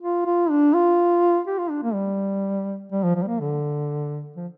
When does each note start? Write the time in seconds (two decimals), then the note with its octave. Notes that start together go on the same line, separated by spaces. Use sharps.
0.02 F4
0.25 F4
0.50 D4
0.74 F4
1.47 G4
1.59 F4
1.70 D4
1.83 A#3
1.94 G3
2.92 G3
3.04 F3
3.15 F3
3.23 G3
3.27 A#3
3.40 D3
4.36 F3